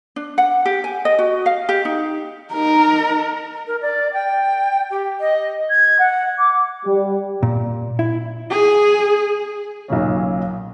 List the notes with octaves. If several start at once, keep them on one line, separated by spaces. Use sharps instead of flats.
D4
F#5
G4
G#5
D#5
F#4
F5
G4
D#4
D#4 A#4 A#5
A#4
D5
G5
G4
D#5
G#6
F#5
D6
G3
A#2
E4
G#4
B1 A#2 C#3 C#4